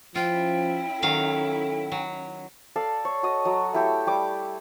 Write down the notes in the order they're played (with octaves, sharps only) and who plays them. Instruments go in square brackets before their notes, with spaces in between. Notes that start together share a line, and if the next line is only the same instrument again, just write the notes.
[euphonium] F3 [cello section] C#4 E4 [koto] F4 [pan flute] G5
[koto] D#3 F#3 F5 [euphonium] A4
[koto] F#3
[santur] A4 D5 F5
C#5
F#4 D#5
F#3 F#4 D#5
A3 E4 G4 A4
G3 D6